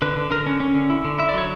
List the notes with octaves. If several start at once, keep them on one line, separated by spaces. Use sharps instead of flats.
D3 B4
D3
D3 A#4
C#4
C#4
D3
E4
D3
E4 E5
D5
F#3 C#5